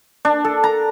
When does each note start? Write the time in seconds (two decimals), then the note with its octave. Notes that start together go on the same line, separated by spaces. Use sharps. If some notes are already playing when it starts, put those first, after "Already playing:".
0.25 D4
0.45 A4
0.64 A#5